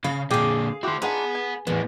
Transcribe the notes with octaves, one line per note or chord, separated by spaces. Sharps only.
C#3 F5 B5
A#2 D3 D4 G4 G#4 F5
E4 F#4 G4 C5
D4 D#4 F4 G#4 B4 F#5
G#5
E2 A2 B3